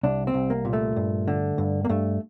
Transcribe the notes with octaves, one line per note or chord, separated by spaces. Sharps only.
C2 D4
C4
C2
A#3
A#2
A3
G2
D3
G2
A#3
G2 A3